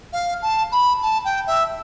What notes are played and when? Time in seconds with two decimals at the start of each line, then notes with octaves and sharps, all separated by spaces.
0.13 F5
0.42 A5
0.72 B5
1.02 A5
1.25 G5
1.47 E5